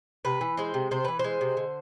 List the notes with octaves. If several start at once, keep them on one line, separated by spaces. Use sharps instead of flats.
C3 B4
E3
G#3 C5
C3
C3 C5
E3 B4
G#3 C5
C3
D3